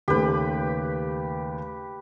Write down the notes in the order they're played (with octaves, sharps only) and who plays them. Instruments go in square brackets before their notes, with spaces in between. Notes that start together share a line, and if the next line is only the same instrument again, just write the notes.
[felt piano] D#2 C#3 A3 [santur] G4 B4